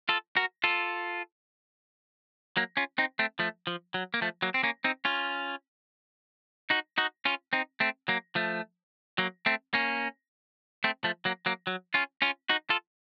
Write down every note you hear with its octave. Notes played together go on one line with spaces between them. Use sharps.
F4 A4
F#4 A#4
F4 A4
F#3 A#3
C#4 F4
C4 D#4
A3 C4
F3 A3
F3
F#3
A#3
F3 A3
F#3 A#3
C4
A#3 C#4
C4 D#4
C#4 F4
D#4 F#4
D#4 F#4
C#4 F4
C4 D#4
A3 C4
F#3 A#3
F3 A3
F#3 A#3
A3 C4
A#3 C#4
A3 C4
F3 A3
F#3 A#3
F#3 A#3
F#3
C#4 F4
C#4 F4
D#4 F#4
F4 A4